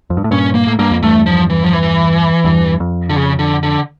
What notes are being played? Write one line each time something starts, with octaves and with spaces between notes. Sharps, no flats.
F2
G2
A2
G2 A#2 C#4
A#3
A2
G2 A#3
F2
E2 G2 A3
F3
E3
F3
E3
E2 G2
F2
D3
C#3
D3
D3